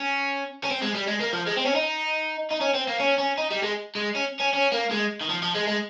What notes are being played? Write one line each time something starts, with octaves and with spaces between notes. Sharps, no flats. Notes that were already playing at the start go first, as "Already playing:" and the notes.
Already playing: C#4
C#4
C4
G#3
G3
G#3
A#3
F3
G#3
C4
C#4
D#4
D#4
C#4
C4
A#3
C#4
C#4
D#4
G3
G#3
G#3
C#4
C#4
C#4
A#3
G#3
D#3
F3
F3
G#3
G#3